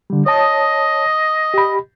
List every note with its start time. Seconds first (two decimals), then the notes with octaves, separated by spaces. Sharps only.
0.10 D3 G3
0.26 C#5 D#5 A5 D#6
1.54 G4 B5